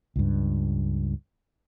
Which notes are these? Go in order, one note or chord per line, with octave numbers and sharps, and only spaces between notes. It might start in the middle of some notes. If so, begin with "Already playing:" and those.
C#2 G2